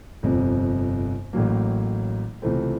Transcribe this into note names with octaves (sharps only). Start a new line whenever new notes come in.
G1 F2 C3
A1 A2 F#3 A#3
C#2 C3 E3 A3 C4